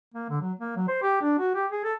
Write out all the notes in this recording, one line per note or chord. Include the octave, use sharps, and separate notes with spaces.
A#3
D3
F#3
A#3
F#3
C5
G4
D4
F#4
G4
G#4
A4